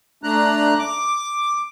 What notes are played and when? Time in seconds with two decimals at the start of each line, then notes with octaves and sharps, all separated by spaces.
0.23 A3 D4 A#5 F#6
0.79 D6